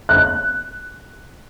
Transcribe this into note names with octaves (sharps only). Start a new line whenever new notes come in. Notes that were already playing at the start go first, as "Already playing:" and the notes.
F#6